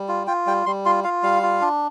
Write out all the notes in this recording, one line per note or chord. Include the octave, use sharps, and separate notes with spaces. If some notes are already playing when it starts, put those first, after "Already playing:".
Already playing: G3
F4
F4 G5
G3 G5
G3 C6
F4 C6
F4 F5
G3 F5
F4
D4